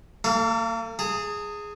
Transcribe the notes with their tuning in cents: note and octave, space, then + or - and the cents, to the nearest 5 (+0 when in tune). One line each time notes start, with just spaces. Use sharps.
A#3 -35 A4 +30 F5 +0
G#4 +0 A5 +40